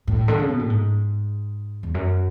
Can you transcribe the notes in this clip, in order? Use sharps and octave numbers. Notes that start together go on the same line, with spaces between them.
A2
D3
C#3
B2
A2
G#2
E2
F#2